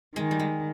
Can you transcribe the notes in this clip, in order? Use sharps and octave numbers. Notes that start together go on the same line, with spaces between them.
D#3 G#3
G3
G#3